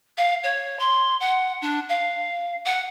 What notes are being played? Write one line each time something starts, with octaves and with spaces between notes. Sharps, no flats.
F5
C#5
C6
F#5
D4
F5
F#5